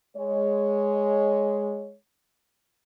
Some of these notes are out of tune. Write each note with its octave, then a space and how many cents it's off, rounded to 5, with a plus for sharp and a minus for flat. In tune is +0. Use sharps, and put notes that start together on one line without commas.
G#3 +0 C#5 +0